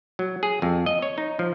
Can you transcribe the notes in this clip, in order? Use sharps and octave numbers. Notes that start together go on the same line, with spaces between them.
F#3
G#4
F2
D#5
C#5
D#4
F3